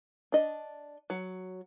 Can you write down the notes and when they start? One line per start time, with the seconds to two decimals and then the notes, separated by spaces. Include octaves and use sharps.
0.32 D4 D#5
1.10 F#3